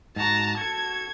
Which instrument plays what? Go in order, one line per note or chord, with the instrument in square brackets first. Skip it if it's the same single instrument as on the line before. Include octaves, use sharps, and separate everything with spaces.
[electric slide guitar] G#2 F#4 [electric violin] A5 A#5
[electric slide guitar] F#4 A4 [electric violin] G#6